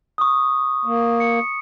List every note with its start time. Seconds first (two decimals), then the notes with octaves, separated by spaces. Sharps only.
0.18 C#6 D#6
0.85 A#3
1.20 C#7